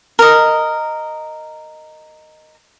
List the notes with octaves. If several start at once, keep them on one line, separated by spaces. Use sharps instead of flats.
A#4 D#5